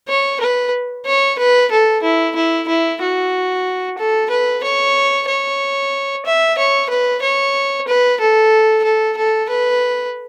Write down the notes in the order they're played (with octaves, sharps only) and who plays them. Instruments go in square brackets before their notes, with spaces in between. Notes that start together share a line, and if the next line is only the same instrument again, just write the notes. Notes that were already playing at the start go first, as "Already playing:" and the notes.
[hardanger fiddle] C#5
B4
C#5
B4
A4
E4
E4
E4
F#4
A4
B4
C#5
C#5
E5
C#5
B4
C#5
B4
A4
A4
A4
B4